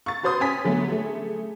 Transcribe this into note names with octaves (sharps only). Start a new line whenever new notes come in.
C#6 A6
F#4 B4 C5 C6 D#6
C#4 G#5 B6
D3 F#3 A3 B3
A3 G#4